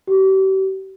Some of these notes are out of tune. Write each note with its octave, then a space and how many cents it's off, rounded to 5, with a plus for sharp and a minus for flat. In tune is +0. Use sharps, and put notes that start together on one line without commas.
G4 -40